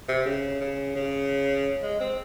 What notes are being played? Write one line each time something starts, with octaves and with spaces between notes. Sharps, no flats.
C3
C#3
C#3
C#3
G#3
C4